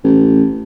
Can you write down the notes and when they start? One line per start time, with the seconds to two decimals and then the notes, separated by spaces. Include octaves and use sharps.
0.04 A1